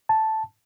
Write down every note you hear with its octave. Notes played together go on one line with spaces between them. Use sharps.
A5